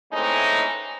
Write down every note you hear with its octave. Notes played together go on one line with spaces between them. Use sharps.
E3 G#3 A3 C4 C#4 D#4